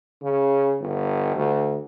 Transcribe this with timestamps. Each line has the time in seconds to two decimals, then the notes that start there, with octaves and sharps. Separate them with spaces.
0.22 C#3
0.79 G1
1.36 D2